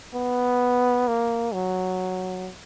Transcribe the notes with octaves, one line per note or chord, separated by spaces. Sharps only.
B3
A#3
F#3